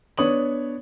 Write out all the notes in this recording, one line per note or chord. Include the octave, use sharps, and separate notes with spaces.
B3 D4 C#5 D#6 F#7